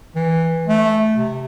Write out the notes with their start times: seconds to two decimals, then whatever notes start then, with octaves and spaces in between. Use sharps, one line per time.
0.16 E3
0.67 A3
1.14 C3